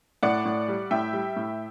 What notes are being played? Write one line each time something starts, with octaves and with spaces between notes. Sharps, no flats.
A2 D5 F#5
A2
G3
A2 E5 G5
G3
A2